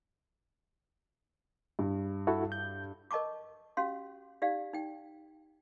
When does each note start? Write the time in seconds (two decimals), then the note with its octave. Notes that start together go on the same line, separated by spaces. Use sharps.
1.79 G2
2.27 E4 F#4 A4
2.52 G6
3.11 A#4 D#5 A5 C#6 D6
3.77 C#4 F#4 G4 F5 C6
4.42 D#4 G4 D5 F5
4.73 D#4 G5